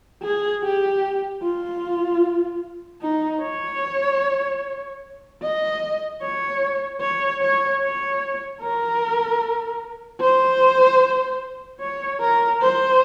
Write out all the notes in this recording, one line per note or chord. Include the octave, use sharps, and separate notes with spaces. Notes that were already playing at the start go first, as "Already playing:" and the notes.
G#4
G4
F4
D#4
C#5
D#5
C#5
C#5
C#5
C#5
A#4
C5
C#5
A#4
C5